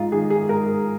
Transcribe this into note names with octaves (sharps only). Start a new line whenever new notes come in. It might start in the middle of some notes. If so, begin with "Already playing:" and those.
Already playing: G#2 F4
D#3 G#4
G#4
G#2 A#4